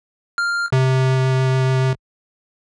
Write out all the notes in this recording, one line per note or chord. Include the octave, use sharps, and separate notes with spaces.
F6
C3